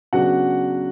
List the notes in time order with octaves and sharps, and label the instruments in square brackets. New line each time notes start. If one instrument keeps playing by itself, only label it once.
[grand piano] C#3 F#3 B3 D4 F#4 F#5